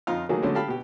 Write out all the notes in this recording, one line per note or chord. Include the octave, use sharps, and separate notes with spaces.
F2 D#4 F4 A#5 F6
D#3 F#3 A3 A#3 G#4
D3 F#3 G#3 A3 B3 C#4
G4 A4 F5 A5 B5
B2 G4